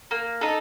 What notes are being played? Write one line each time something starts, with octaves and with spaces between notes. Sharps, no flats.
A#3
D#4 A4